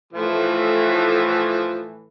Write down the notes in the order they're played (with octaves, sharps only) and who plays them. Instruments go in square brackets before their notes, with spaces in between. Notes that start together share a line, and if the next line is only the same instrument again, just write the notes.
[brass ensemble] A2 E3 [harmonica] F3